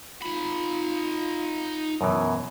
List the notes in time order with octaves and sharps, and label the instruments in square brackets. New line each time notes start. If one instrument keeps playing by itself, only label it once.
[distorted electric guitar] D#4 B5 [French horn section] F4
[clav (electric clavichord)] F#2 B2 E3